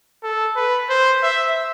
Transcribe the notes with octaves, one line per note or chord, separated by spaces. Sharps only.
A4
B4
C5
E5